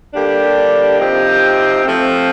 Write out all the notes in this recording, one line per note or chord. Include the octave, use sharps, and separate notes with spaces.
D3 G3 A#3 D4 G4
C3 F3 C4 D#4 G4
F3 A3 C4